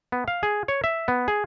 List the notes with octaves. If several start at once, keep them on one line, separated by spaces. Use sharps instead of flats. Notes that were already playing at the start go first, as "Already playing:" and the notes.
B3
F5
G#4
C#5
E5
B3
G#4